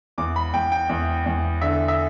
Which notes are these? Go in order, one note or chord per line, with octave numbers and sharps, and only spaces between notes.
E2 D6
B5
E2 G5
G5
E2
E2
D3 E5
E5